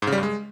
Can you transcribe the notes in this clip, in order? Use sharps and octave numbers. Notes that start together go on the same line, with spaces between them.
G#2
C#3
G3
G2
G#3